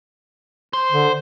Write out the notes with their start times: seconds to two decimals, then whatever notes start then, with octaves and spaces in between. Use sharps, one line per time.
0.73 C5
0.92 D3